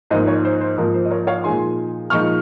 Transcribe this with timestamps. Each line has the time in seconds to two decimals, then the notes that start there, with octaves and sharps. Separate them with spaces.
0.10 G#2 F3 A#3 D#4 C5 D#5
0.27 A#4 C#5
0.45 C5
0.61 C5
0.78 G#2 F3 A#3 D#4 A#4
0.94 C5
1.05 D#5
1.11 A#4 C#5
1.27 C#5 F5
1.44 A#2 F3 G#3 D#4 G#5 C6
2.10 A#2 F3 G#3 D#4 C#6 F6